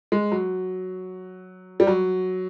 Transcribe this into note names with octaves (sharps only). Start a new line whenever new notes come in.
G#3
F#3
G3
F#3